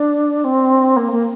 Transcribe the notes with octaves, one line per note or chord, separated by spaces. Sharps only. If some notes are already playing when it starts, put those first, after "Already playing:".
Already playing: D4
C4
A#3
A#3